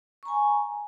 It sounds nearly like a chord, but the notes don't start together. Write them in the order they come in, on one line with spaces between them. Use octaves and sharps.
C#6 A#5 G#5